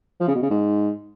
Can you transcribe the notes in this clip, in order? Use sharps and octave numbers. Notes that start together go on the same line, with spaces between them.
F3
C#3
B2
C#3
G#2